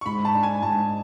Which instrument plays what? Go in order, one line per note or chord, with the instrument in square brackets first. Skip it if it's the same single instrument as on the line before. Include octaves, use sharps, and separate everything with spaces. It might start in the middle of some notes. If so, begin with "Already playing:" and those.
[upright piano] C#6
[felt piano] G#2 [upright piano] B5
[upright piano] A5
[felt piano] D4
[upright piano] G#5
[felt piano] G#2 [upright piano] A5